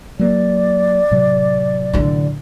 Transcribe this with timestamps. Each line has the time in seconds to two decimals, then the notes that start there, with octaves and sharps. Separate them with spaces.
0.19 F#3 A#3 D5
1.11 A2 C3 F#3
1.93 A1 D3